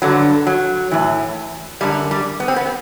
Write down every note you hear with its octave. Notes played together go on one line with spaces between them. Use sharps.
G2 D3 F#3
F#3
A2 E3
F#2 D3 G3
G3
B3
C4
B3